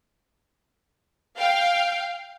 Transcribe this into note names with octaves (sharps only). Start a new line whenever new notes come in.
F5 G5